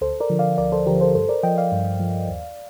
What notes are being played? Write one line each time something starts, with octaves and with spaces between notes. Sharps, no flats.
D2 A4 C5
A#4 D5
D3 F3
D5 F5
D2 A#4 D5
A4 C5
D3 F3 G4 A#4
A4 C5
G2 A4 C5
A#4 D5
F3 D#5 G5
D5 F5
G2
F3
D#2